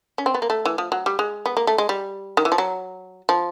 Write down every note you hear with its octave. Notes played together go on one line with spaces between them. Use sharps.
C#4
C4
B3
A#3
A3
E3
F3
F#3
G3
G#3
B3
A#3
A3
G#3
G3
D#3
E3
F3
F#3
F3